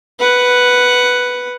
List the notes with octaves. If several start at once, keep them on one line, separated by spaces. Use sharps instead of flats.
B4 F#5